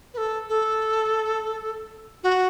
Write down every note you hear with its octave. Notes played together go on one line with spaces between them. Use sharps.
B4
A4
A4
F#4